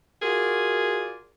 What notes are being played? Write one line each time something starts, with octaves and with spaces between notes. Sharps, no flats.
F4 F#4 G#4 A#4 D5